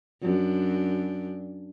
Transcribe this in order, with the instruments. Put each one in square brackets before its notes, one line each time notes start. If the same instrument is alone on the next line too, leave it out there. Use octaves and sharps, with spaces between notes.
[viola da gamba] F#2 D4